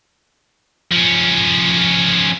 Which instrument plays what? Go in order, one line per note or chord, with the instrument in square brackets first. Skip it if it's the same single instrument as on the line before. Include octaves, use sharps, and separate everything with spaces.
[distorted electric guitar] F3 C#4